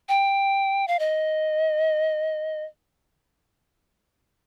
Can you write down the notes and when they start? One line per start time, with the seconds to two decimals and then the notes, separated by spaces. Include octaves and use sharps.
0.09 G5
0.88 F5
0.99 D#5